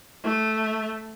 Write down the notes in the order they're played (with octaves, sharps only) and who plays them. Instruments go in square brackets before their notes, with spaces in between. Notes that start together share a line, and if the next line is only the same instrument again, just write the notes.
[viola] A3